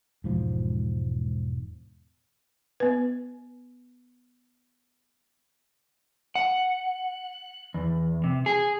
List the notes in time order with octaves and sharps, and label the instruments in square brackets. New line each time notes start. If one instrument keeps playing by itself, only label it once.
[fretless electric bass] E1 G#2 F3
[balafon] B3 B4
[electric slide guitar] F#5
E2
C3
G#4